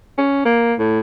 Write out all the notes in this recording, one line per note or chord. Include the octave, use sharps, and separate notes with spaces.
C#4
A#3
A2